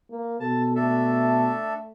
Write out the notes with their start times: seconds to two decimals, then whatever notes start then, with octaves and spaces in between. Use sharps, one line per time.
0.10 A#3
0.40 B2 A4 A5
0.76 A3 D4 A4 E5